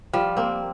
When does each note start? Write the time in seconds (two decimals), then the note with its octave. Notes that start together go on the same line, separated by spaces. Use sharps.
0.13 F3 G3
0.37 A#3 C4